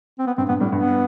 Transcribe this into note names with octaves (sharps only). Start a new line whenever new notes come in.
C4
B3
G2 C4
G2 B3
A2 G3
G2 B3